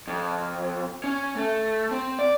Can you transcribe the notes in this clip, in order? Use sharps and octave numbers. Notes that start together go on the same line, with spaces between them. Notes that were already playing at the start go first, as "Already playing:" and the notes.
F2
C#4
A3
C4
D5